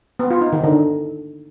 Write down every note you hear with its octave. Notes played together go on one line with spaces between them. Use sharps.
B3
F4
D#4
D#3
D3